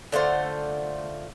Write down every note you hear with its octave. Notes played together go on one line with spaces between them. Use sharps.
D3 A3 F4 C5